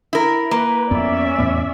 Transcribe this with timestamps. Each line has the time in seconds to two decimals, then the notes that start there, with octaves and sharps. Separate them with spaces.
0.13 E4 A#4
0.51 A#3 B4
0.91 F2 B3 C#4 D5 E5
1.38 E2 A2 B3